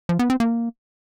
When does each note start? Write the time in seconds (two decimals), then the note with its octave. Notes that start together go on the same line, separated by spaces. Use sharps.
0.09 F3
0.19 B3
0.30 C4
0.40 A#3